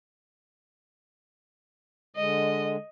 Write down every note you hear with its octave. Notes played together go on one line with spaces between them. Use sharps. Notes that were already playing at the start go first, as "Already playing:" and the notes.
D3 G#3 D#5